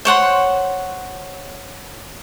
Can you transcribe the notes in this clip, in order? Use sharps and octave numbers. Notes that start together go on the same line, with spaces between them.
C5 C#5 F#5 C6